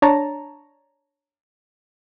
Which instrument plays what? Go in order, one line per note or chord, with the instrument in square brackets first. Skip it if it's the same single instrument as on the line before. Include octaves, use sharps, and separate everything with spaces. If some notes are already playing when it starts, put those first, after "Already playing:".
[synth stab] D4 C#5 A5 A#5